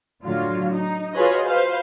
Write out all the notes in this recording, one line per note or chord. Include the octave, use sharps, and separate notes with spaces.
A2 D3 F#3 F4
D#4
F4 F#4 G#4 B4 C#5 D#5
B4 C5 F5